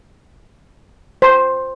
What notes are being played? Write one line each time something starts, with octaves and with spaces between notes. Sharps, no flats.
C5